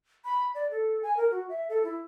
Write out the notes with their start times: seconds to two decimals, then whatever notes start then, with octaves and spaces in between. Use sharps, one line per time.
0.25 B5
0.55 D5
0.71 A4
1.03 G#5
1.17 A#4
1.31 F#4
1.49 E5
1.69 A4
1.83 E4